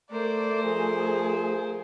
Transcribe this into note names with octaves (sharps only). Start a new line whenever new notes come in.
A3 A#4 C5 D5
F3 G#4